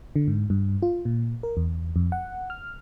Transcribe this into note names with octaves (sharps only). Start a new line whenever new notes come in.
D3
G#2
G2
F4
A#2
A#4
E2
F2
F#5
F6